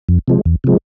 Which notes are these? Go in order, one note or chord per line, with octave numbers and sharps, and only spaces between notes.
F2
C3 F3 G#3
E2
C3 F3 G#3